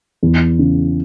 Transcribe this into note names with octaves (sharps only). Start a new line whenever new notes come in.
E2
C#3